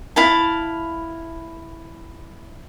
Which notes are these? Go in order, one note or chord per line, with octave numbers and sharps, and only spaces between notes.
E4 F5 A5